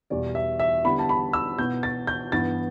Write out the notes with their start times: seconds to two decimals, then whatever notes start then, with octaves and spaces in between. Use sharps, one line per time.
0.10 E2 B2 G3 D5
0.35 E5
0.60 E5
0.84 D3 G3 B3 E4 B5
0.99 A5
1.09 B5
1.33 E6
1.58 B2 B3 E4 G6
1.83 A6
2.07 G6
2.32 G2 E3 B3 E4 A6